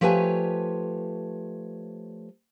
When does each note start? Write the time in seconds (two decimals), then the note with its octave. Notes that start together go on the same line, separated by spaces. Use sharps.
0.01 F3 A3 G4 B4 C#5 G#5